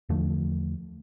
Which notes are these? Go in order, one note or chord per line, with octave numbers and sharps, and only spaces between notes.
E2 D3 F3 A3